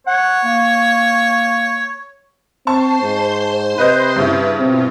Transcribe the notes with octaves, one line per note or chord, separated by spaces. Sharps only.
C#5 F#5
A#3
C4 C5 A5 C6 C#6
G#2
C3 B4 D#5 G6
G2 C#3 E4 B4
B2 C4 F4